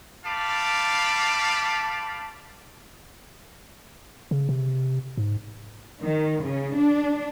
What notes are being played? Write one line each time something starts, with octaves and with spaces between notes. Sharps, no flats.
G3 A3 F5 A5 B5 D6
C#3
C3
G#2
D#3
C#3
D4